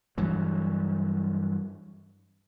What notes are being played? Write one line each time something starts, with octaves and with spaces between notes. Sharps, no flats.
G2 E3 F#3